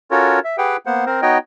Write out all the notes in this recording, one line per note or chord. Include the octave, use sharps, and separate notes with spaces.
C#4 F4 F#4 A4 A#4 C#5
E5
G4 G#4 B4 F#5 G5
A#3 B3 C5 F#5
C4 A#4 C5
B3 D#4 F#4 C#5 D#5 G5